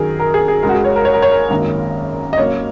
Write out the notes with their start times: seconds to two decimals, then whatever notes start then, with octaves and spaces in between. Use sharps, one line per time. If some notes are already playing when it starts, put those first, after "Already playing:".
Already playing: F#2 D#3 F#3 G#4 A#4
0.20 A#4
0.34 G#4
0.48 G#4
0.63 C#2 C#3 G#3 A#4
0.69 F#4
0.74 G#4
0.85 C#5
0.96 A#4
1.05 C#5
1.14 A#4
1.22 C#5
1.31 A#4
1.50 G#1 F#2 D#3 A#3 A#4
2.33 D#5
2.38 F#1 F#2 F#3 A#3 C#5